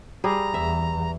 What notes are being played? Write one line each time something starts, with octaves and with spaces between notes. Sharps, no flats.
G3 G#4 A#5
E2 E5